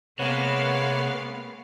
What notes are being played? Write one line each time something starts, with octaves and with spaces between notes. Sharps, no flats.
C3 G#3 A#3 B3 B4 C#5 F5 F#5